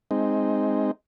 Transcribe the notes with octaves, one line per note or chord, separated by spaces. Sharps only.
G#3 C4 D#4